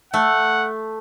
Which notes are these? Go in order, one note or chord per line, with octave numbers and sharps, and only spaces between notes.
A3 F#5